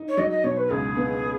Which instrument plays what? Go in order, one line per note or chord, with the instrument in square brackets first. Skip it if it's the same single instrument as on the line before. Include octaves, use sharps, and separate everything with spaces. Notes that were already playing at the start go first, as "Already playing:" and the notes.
Already playing: [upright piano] D#4
[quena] C#5
[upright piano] F#3 [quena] D#5
[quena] D#5
[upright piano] B2 [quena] C#5
[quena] B4
[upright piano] C#2 [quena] G#4
[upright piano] B3